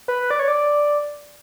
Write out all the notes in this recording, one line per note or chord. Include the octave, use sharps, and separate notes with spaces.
B4
D5
C#5
D5